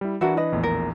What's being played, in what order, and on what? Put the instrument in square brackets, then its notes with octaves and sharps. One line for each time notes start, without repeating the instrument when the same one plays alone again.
[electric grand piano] G3 E4
[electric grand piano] E3 D4 [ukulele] E4 F#4 A#4
[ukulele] B4 D#5
[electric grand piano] A#1 E2 A2
[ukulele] A#4